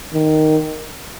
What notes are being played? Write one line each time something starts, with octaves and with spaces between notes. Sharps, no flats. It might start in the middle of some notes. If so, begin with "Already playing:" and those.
D#3